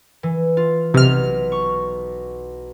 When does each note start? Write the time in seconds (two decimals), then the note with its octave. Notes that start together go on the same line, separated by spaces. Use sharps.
0.23 E3
0.57 F4
0.94 B1 C3 F6
1.52 C#6